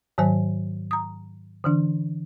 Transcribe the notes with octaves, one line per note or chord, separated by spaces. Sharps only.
G#2 D#3 F#3 C5 G#5
A#5 D#6
D3 E3 D4